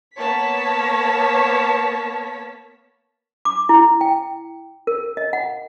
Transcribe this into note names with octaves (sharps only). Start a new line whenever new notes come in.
A#3 B3 C#5 A5 B6
D6
E4
G5
A#4
D#5
F#5